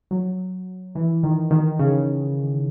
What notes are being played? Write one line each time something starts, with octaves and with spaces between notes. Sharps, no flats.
F#3
E3
D#3
D#3
C#3